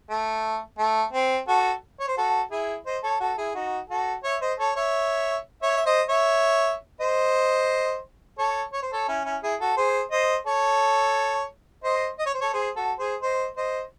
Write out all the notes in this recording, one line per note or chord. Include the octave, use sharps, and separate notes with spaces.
A3
A3
C4
F#4 A4
C#5
C5
F#4 A4
E4 G#4
C5 D#5
A4 C#5
F#4 A4
E4 G#4
D#4 F#4
F#4 A4
C#5 E5
C5 D#5
A4 C#5
C#5 E5
C#5 E5
E5
C5 D#5
C#5 E5
C5 D#5
A4 C#5
C#5
C5
A4 C#5
C#4 E4
C#4 E4
E4 G#4
F#4 A4
G#4 C5
C5 D#5
A4 C#5
C5 D#5
D#5
C#5
C5
A4 C#5
G#4 C5
F#4 A4
G#4 C5
C5 D#5
C5 D#5